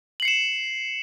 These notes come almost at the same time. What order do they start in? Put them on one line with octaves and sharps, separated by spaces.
F#7 C7 C#7 E7